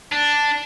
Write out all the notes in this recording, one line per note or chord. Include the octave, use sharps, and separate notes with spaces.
D4